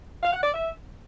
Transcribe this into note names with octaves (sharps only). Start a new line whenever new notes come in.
F5
F#5
D5
E5